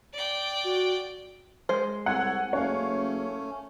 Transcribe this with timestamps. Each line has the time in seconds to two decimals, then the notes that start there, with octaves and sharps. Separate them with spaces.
0.13 D5 G5
0.64 F#4
1.69 G#3 C5
2.06 C2 A4 C#5 F#5 G#5
2.53 F#1 A3 C#4 C#5 F5